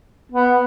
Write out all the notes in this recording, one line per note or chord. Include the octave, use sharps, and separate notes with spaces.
B3